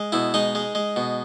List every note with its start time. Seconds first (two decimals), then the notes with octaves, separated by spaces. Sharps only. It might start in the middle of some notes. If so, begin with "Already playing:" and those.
Already playing: G#3
0.12 B2 E4
0.34 G#3 D#4
0.55 G#3
0.75 G#3
0.96 B2